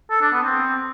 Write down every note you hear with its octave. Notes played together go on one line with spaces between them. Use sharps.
A4
D4
B3
C4